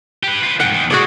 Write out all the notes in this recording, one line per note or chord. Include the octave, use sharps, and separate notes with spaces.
G4 B4
F4 B4
F2 G#2 F#5 G5
E2 D#3
A2 F#4 G#4 D5